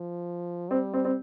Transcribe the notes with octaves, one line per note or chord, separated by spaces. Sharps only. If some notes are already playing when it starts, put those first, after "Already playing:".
Already playing: F3
G3 C4
C4
C4